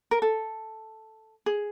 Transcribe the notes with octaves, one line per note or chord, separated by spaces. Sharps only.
A#4
A4
G#4